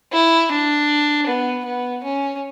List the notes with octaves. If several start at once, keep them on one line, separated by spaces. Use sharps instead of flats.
E4
D4
B3
B3
C#4